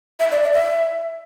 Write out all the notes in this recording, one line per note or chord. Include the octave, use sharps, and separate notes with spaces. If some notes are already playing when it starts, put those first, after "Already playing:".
E5
D5
D5
E5